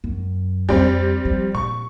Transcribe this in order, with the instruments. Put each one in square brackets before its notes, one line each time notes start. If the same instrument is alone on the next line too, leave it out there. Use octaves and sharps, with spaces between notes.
[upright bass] F#2
[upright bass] F2 F3 [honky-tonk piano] G3 C4
[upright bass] F3
[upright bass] A#2 [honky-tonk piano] C#6